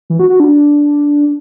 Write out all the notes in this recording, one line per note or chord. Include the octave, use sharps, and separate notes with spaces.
E3
F#4
F#4
D4